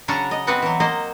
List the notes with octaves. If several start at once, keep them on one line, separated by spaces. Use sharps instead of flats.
C#3 F#3 C#4 D4 A#5
D#5
B3 C4 F#4 B4
E3 F#3
A#3 C5 D#5